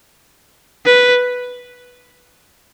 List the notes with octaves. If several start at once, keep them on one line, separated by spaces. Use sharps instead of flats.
B4